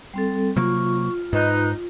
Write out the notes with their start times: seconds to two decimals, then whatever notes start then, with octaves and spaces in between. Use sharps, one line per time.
0.14 G3 C4 A4
0.56 C3 F#3 A#3 F4 C#6
1.33 G#2 D#4 B4